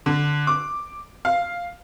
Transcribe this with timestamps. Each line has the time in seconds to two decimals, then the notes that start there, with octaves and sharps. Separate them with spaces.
0.06 D3
0.47 D6
1.25 F5